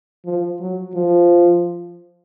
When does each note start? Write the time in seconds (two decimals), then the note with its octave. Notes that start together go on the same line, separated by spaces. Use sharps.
0.25 F3
0.60 F#3
0.95 F3